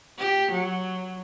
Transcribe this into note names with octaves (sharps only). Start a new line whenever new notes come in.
G4
F#3